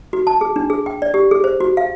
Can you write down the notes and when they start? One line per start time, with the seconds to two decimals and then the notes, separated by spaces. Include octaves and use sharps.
0.13 F#4
0.27 A5
0.41 G#4
0.56 D4
0.70 G#4
0.86 G5
1.02 D5
1.14 G4
1.31 G#4
1.44 C5
1.60 F#4
1.77 F5